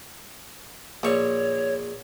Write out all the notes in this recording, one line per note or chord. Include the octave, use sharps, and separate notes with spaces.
A#1 C#5 C#6